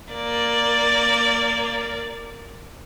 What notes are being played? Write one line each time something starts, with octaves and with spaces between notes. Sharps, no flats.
A#3 D5